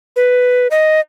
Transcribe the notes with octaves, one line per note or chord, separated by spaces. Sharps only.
B4
D#5